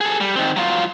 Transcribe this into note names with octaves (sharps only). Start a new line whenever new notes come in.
G#4 A4
G3
D#3 C4
F#3 F4